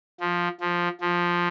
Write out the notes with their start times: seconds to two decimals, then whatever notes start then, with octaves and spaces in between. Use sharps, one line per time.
0.20 F3
0.61 F3
1.01 F3